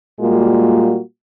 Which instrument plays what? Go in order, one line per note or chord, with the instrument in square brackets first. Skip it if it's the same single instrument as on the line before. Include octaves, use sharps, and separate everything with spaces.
[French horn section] A#2 G3 G#3 A#3 F4 F#4